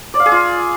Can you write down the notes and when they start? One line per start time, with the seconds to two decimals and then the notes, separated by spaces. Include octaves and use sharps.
0.14 D5
0.20 F5
0.26 G#4
0.32 F4